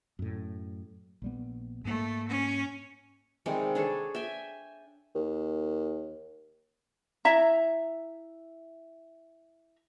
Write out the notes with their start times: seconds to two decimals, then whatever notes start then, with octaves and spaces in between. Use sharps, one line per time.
0.19 F#2 A2
1.22 A#1 G3 B3
1.85 G#2 A3 A#3
2.29 C#4
3.46 C3 D#3 G3 G#3
3.75 D4 G#4 A4 C#5
4.15 E5 G5 G#5
5.15 D#2
7.25 E4 E5 A#5